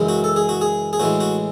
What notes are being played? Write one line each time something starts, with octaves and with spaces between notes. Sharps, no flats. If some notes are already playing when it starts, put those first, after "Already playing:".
Already playing: F#2 C#3 E3 G#3
F#4
A4
G#4
F#4
G#4
G#4
A2 E3 G#3 F#4
F#4